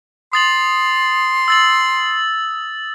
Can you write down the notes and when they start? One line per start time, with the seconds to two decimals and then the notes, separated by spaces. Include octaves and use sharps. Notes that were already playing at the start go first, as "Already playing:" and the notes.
0.33 C6 D#6 A6 F#7
1.48 E6 A6 F#7